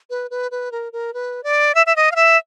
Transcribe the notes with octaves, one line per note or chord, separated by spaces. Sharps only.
B4
B4
B4
A#4
A#4
B4
D5
E5
E5
D#5
F5
E5